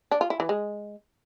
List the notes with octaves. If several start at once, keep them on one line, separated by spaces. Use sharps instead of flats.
D4
F4
E4
E3
G#3